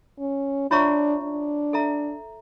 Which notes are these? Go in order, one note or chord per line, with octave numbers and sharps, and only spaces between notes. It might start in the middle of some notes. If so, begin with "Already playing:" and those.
C#4
D4 F4 C#5 E5 A#5 C#6
D4
A4 E5 A#5